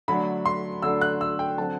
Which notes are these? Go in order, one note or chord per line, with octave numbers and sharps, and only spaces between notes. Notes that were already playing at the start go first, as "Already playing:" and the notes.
D3 F#3 A3 D4 B5
C6
D3 F#3 A3 D4 E6
F#6
E6
G5
D3 F#3 C4 A5